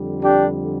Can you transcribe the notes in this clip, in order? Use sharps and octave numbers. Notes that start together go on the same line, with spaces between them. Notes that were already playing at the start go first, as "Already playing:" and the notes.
Already playing: F2 D3 G3
D4 G4